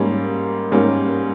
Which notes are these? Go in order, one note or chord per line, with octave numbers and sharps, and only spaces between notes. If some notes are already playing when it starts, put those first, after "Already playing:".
Already playing: G#2 G3 A#3 C#4
G#2 G3 A#3 C#4